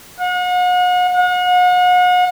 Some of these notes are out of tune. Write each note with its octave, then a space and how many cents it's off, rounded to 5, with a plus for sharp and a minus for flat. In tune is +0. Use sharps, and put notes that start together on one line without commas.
F#5 -40
F#5 -40